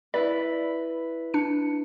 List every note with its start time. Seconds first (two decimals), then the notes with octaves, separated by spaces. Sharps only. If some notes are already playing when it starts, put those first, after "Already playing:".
0.14 E4 B4 D5
1.34 D4 C#7